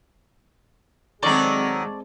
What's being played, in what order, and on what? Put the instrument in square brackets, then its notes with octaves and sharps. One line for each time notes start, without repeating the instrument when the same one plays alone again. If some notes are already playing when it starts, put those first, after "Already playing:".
[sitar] D#3 F#3 D#4 [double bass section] G#3 C4 [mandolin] A4 D5 C#6